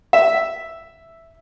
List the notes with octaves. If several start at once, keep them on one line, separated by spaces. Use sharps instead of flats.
E5